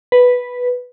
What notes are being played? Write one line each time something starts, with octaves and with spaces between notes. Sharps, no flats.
B4